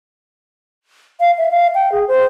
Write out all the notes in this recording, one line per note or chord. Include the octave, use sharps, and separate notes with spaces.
F5
E5
F5
G5
G#4
C5